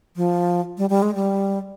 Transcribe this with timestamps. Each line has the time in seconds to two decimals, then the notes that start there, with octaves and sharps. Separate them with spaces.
0.17 F3
0.78 G3
0.90 G3
1.02 G#3
1.15 G3